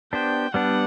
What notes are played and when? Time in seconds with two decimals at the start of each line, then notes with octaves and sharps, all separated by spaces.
0.13 B3 D4 G4 C5 G5
0.54 G3 B3 D4 F#5